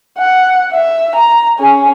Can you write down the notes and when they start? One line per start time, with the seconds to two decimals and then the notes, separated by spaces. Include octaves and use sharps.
0.18 F#5
0.72 E5
1.16 A#5
1.59 C#4 G#4